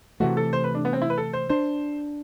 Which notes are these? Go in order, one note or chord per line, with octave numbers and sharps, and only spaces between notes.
C3 E3 A3 F#4
A4
C5
B4
D4
B3
C4
E4
B4
A4
C5
D4 C5